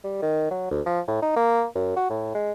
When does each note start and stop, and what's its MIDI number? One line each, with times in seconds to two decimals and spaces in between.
0.04 0.17 55
0.22 0.47 51
0.51 0.67 54
0.71 0.81 38
0.86 1.00 53
1.07 1.18 45
1.22 1.33 63
1.36 1.65 58
1.75 1.96 42
1.96 2.09 66
2.10 2.34 45
2.35 2.52 56